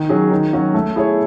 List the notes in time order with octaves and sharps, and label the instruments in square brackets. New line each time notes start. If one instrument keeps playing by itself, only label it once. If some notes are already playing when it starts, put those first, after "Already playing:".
Already playing: [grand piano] D#3
F#3 C#4 G#4
D#3
F#3 C#4 F#4
A3
E4 G#4 C#5